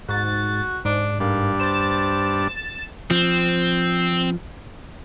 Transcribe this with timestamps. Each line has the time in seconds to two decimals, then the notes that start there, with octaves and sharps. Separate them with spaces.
0.08 G#2 F#4 A6
0.85 G#2 D4
1.20 G2 A#3 D4
1.60 C5 A6 E7
3.11 F3 C4